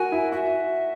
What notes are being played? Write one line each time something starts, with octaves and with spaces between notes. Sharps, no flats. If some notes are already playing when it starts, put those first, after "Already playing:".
Already playing: F#4 A#4 G#5
E4
F#4 E5